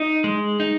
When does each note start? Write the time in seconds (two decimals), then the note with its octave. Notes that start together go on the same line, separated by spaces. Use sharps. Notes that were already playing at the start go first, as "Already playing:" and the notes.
Already playing: D#4
0.24 G#3
0.60 D#4